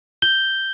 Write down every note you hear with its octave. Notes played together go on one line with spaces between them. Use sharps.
G6 G7